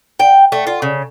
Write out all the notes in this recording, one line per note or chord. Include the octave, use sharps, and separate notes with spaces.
G5
A3
F4
C#3